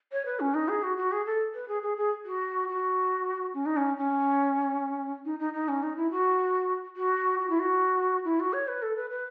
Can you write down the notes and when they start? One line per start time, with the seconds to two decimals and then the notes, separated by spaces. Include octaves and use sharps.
0.12 C#5
0.25 B4
0.40 C#4
0.54 D#4
0.68 G#4
0.83 F#4
0.97 F#4
1.12 G#4
1.26 A4
1.55 B4
1.68 G#4
1.82 G#4
1.97 G#4
2.25 F#4
2.68 F#4
3.54 C#4
3.66 D#4
3.76 C#4
3.97 C#4
5.25 D#4
5.39 D#4
5.53 D#4
5.68 C#4
5.83 D#4
5.96 E4
6.11 F#4
6.96 F#4
7.39 F#4
7.50 E4
7.59 F#4
8.25 E4
8.40 F#4
8.53 C#5
8.68 B4
8.82 A4
8.96 B4
9.10 B4